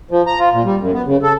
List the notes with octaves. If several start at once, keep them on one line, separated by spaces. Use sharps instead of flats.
F3
A#5
F4
A#2
G3
F#2
B3
C#3
A4